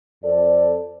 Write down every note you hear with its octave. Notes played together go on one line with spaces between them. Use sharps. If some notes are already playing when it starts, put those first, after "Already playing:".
F2 A4 C5 D5